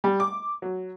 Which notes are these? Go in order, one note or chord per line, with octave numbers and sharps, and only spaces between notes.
G3
D6
F#3